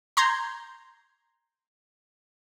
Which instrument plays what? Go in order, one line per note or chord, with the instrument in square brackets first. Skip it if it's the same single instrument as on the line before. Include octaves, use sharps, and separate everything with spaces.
[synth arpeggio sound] A#5 C6 G6 G#6